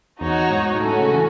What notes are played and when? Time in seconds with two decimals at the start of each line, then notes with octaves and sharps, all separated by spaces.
0.21 E2 D#4 F#4 C#5
0.51 G#2
0.75 G#2
0.80 A2 C#4 F#4 A4
1.00 C#3
1.14 E3